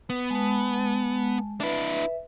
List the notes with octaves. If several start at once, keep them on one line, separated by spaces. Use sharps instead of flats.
B3
G#3 A5
D4 E4 B4 E5